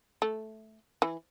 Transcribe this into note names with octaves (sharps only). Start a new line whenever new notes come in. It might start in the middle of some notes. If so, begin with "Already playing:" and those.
A3
E3